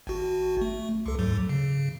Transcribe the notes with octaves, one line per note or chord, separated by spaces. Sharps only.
G#1 F#4
A3
C#2 A4
D#2 G#2 F#3
C#3